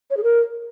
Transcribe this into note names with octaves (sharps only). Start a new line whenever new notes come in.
C#5
G#4
A#4